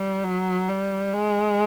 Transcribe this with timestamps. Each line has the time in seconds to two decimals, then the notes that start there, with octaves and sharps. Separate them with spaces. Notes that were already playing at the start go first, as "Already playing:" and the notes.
Already playing: G3
0.24 F#3
0.69 G3
1.13 G#3